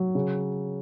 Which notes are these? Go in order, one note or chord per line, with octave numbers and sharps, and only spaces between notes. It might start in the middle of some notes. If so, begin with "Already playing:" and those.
Already playing: F#3
C#3